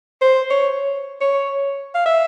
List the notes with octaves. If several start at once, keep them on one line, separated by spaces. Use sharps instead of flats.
C5
C#5
C#5
F5
E5